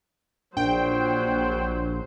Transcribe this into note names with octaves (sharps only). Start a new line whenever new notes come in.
A#1 F#3 D4 C5 G5